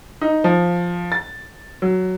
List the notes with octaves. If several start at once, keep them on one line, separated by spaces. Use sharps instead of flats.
D#4
F3
A6
F#3